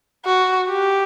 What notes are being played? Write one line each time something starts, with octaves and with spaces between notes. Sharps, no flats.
F#4
G4